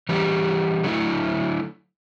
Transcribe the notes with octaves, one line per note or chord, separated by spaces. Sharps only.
E3 G3 C#4 G4
D3 F#3 A3 E4